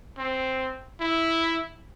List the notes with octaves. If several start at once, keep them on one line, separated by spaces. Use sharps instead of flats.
C4
E4